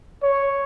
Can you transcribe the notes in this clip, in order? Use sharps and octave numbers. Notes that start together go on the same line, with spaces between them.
C#5